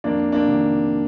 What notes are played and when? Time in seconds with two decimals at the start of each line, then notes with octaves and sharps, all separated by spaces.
0.04 F2 A#3 D4
0.32 A#3 D4
0.47 C3 D#3